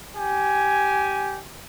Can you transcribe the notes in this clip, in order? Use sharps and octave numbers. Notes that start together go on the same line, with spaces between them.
G4 G#5